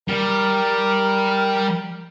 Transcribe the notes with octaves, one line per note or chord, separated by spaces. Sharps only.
G3 G4 A#4